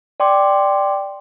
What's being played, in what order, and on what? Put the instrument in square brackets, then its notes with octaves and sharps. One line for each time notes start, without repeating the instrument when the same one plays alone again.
[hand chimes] D5 G5 C6 D6